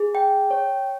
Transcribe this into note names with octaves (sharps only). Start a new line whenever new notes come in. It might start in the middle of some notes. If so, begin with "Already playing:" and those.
Already playing: G#4
G5
C#5